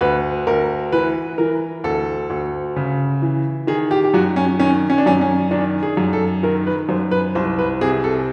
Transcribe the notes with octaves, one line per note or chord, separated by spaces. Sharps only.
D2 B4
D2 A#4
E3 B4
E3 A#4
D2 A4
D2
C#3
E3
D#3 G#4
G4
G4
F#2 F#4
C#4
D#3 C#4
C#4
D4
F#2 C#4
C#4
D#3 D4
G#4
F#2
A4
D#3 A#4
B4
F#2 C5
B4
C2 C5
B4
C3 G#4
A4